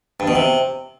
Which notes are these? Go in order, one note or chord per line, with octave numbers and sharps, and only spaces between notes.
G2
B2
C3